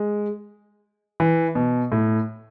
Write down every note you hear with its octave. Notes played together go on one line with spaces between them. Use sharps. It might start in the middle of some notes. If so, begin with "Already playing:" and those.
Already playing: G#3
E3
B2
A2